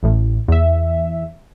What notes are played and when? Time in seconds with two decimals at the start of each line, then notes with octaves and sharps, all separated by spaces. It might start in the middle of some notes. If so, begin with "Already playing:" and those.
0.03 A1 A2
0.48 E2 E5